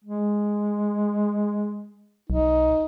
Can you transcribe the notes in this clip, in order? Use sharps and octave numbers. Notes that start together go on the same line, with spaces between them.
G#3
B1 D#4